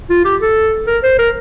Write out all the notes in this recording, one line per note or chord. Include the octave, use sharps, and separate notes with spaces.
F4
G4
A4
A#4
C5
A#4